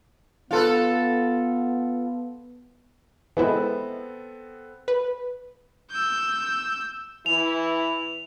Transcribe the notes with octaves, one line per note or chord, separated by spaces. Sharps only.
B3 F4 A4 B4
E3 G#3 B3 C4 E4 A4
B4
E6 G6
E3 E4 F7